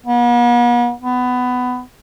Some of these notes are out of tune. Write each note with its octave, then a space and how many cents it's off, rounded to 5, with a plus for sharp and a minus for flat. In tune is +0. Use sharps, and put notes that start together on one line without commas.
B3 -45
B3 +15